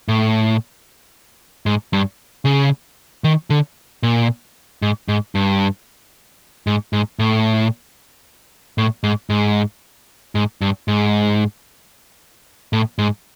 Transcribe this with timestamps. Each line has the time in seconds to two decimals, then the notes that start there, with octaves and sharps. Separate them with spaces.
0.08 A2
1.66 G#2
1.93 G2
2.45 C#3
3.24 D#3
3.50 D3
4.03 A#2
4.82 G#2
5.08 G#2
5.35 G2
6.67 G#2
6.93 G#2
7.19 A2
8.78 A2
9.04 G#2
9.30 G#2
10.35 G#2
10.61 G2
10.88 G#2
12.73 A2
12.98 G#2